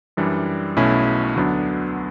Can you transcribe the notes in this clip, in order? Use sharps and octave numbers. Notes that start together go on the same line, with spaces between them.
F#2 E3 G3 D4
B1 B2 A3 C#4 E4
D2 D3 F#3 B3 D4